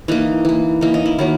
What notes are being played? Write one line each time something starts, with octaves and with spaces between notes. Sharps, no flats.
E3 A#3 D#4
E3 A#3
E3 A#3 D#4
D#4
E4
D#3 F#3 A#3 E4